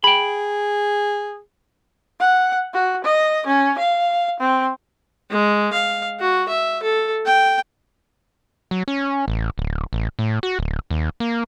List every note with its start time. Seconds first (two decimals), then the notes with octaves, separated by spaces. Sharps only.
0.04 G#4 G5 B5
2.20 F#5
2.74 F#4
3.04 D#5
3.46 C#4
3.79 F5
4.40 C4
5.30 G#3
5.73 F5
6.20 F#4
6.49 E5
6.83 A4
7.26 G5
8.71 F#3
8.88 C#4
9.28 A1
9.58 D1
9.93 A1
10.19 A2
10.43 F#4
10.59 D1
10.91 D#2
11.20 A#3